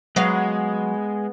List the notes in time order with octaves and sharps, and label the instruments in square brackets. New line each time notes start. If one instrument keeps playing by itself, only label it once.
[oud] F#3 F5 [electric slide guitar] G#3 [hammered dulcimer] B3